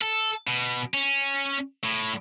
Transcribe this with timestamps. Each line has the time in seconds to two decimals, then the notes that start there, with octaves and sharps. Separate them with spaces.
0.01 A4
0.47 B2
0.94 C#4
1.84 A2